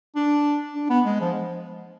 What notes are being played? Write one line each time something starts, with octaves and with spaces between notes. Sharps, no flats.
D4
D4
B3
G#3
F3